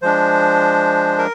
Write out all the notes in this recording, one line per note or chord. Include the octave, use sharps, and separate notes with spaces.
F3 G#3 D4 C5
A#4